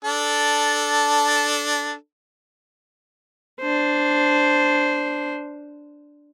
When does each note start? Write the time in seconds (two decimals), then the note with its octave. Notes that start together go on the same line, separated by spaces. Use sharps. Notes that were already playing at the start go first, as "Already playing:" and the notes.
0.05 D4 A4
3.60 D4 C5